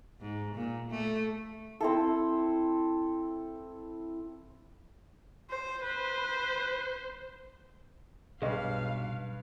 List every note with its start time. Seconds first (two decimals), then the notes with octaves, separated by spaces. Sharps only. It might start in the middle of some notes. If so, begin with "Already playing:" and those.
0.21 G#2
0.55 A#2
0.90 A3
1.80 C4 E4 A4
5.50 C5
5.84 B4 C5
8.42 B1 G2 G#4 B4 D#5 F5